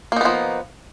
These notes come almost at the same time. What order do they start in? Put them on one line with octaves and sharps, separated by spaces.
A#3 D#4 B3 F3